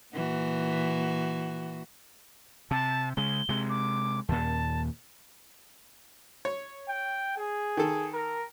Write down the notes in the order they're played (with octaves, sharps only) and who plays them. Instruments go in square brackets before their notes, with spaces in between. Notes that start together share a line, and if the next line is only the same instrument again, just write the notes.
[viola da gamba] A#2 E3 F#4
[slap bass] C3 [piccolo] A5
[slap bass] C#3 G#3 [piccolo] G7
[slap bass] C3 G#3
[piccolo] D6
[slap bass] D#2 A#2 [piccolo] A5
[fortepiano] C#5
[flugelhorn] G5
G#4
[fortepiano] D#3 A4
[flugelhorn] A#4